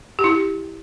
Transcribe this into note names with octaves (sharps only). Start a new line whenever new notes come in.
G4
E4
G4